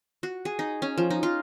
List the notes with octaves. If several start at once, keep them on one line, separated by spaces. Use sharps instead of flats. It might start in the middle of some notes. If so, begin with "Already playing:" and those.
F#4
G#4
D#4
C#4
F3
D#4
F4